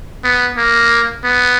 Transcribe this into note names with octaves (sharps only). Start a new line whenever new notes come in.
B3
A#3
B3